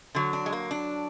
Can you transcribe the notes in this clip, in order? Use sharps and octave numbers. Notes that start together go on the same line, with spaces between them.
D3 F#3
D4
G#3
A#3
D4